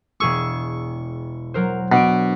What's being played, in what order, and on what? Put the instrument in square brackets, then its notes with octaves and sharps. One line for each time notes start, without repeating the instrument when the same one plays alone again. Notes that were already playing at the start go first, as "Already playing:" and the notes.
[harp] E1 G#4 E6 [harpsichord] C#6
[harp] F#3 A#4 C5
[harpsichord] B2 [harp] D4 D7